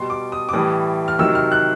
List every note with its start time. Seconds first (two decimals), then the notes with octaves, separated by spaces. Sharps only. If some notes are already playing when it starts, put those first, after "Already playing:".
Already playing: B2 G3 C6
0.10 D6
0.32 D#6
0.49 D6
0.53 A2 E3 G3 D#6
1.08 F6
1.19 C3 D#3 F#3 E6
1.35 F6
1.52 F#6